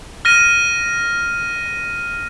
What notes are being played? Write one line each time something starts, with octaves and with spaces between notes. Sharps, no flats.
F6 A#6 D#7